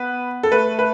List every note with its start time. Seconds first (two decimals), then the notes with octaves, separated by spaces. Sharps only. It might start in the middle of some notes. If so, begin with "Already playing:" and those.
Already playing: B3 B4
0.43 A4
0.52 A3 B4
0.79 B4